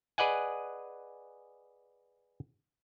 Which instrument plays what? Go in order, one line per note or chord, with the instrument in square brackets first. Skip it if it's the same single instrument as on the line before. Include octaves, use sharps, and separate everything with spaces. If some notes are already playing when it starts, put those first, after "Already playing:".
[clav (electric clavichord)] G#4 B4 D5 D#5 F#5 G#5